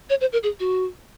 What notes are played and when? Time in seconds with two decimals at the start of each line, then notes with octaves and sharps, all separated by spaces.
0.10 C#5
0.21 C5
0.33 A#4
0.43 G#4
0.60 F#4